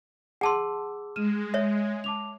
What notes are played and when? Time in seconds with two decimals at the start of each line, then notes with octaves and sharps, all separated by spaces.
0.41 G#4 F#5 A5 C6 D6 E6
1.16 G#3 F6 D#7 E7
1.54 C#5 E5
2.04 A5 D6 F7